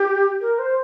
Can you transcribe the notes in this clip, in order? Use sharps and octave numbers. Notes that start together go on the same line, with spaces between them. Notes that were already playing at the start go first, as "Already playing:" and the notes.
Already playing: G4
A#4
C5